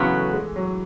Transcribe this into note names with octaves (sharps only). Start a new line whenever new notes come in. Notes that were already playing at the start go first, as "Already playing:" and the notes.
Already playing: C#3 E3 F#3 B3
A3
G#3
F#3